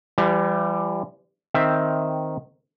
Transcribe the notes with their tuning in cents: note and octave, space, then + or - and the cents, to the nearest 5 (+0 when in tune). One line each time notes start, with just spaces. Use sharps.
E3 +40 G3 +5
D#3 +0 C4 +0 E5 +0